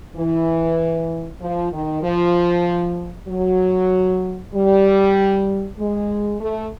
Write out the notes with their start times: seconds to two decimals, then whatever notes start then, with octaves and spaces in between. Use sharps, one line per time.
0.17 E3
1.42 F3
1.73 D#3
2.03 F3
3.28 F#3
4.54 G3
5.79 G#3
6.40 A3